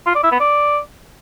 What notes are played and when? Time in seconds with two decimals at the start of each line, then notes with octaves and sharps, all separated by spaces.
0.07 F4
0.15 D5
0.23 E4
0.32 B3
0.40 D5